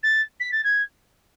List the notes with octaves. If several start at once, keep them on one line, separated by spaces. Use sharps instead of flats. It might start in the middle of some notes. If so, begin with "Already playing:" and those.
A6
B6
A6
G#6